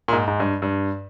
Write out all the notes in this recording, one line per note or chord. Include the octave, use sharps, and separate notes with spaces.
A#2
G#2
G#2
G2
G2